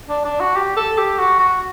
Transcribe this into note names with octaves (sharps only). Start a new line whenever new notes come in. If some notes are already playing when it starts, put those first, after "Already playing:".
D4
D4
F#4
G4
A4
G4
F#4
F#4